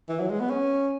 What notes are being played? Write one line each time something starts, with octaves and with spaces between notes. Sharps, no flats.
E3
F#3
G#3
B3
C#4